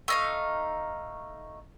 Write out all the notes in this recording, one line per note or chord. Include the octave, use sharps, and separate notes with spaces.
A3 D#4 F5